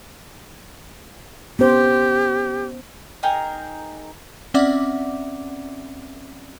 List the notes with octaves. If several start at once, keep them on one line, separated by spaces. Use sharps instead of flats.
B3 C#4 G4 C5
D#4 G#4 A#4 G5
C4 C#4 D5 E5 F#5 D6